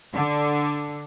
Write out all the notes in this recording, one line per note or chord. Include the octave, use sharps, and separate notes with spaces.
D3